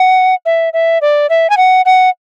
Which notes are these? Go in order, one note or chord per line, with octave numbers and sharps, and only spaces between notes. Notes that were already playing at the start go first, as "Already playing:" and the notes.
Already playing: F#5
E5
E5
D5
E5
G#5
F#5
F#5